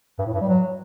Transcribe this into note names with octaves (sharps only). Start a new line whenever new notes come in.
G2
A2
G2
G3
F#3